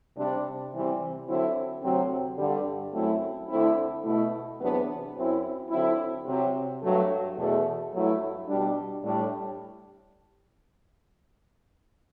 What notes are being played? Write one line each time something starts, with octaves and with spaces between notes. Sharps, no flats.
C3 G3 D4
C3 E3 G3 C4
D3 F#3 C4 E4
D2 C3 F#3 C4
G2 D3 G3
F#2 F#3 A3 C4 E4
D2 D3 A3 C4 E4
B2 A3 E4
E2 C3 F#3 B3 D4
F#2 F#3 C4 E4
D3 F#3 C4 E4
C3 F#3 C4
G2 F#3 A3
E2 B2 A3
G2 F#3 A3 E4
B2 G3 D4
A2 G3 D4